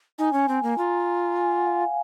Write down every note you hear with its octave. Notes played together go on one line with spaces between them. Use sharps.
D#4 G#5
C#4
C4
A#3
F4 A#5
G#5
F#5
F5
F5